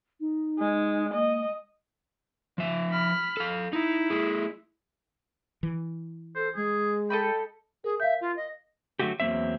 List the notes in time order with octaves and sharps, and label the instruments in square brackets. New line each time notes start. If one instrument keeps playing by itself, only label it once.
[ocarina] D#4
[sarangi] G#3
[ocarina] A#3 [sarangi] D#5
[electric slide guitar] F3 E5
[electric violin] B5 F6
[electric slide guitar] A4 F5
[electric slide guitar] D#4 [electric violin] E4
[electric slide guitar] A3 G#4
[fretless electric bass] E3
[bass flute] A4 [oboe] C5
[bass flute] G#3 [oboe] G#4
[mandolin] A4 D#5 B5 [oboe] G5
[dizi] G#4 [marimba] A#4
[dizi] E5 [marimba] F5 G6
[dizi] F4
D#5
[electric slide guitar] D3 F#3 A3 F#4 G4
E2 F#3 A#3 C4 E5